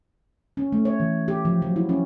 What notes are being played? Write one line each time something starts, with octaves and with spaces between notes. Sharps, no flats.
C#4
A3
C#5
E3
G4
F3
F#3
E4
C#4